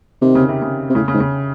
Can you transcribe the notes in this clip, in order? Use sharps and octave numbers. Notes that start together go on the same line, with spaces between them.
C3 D#3
C#3
C3
C#3
C3
A2 C#3
C#3
G#2
C#3